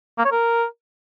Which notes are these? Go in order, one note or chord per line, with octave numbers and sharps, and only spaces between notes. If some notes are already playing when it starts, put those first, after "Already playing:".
A#3
C#5
A#4